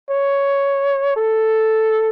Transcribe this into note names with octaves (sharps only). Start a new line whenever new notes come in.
C#5
A4